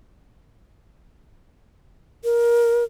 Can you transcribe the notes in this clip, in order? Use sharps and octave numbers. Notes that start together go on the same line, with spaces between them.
A#4